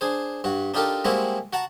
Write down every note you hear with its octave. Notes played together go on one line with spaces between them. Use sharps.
D4 G#4 C5
G2 F#4
D4 D#4 F4 G4 A4 A#4
G3 G#3 A#3 C4 E4 F#4
F#4 F#5 A5 A#5